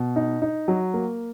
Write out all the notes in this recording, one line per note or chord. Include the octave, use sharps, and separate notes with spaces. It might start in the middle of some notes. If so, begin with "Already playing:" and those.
Already playing: B2
D#4
D#4
F#3
A#3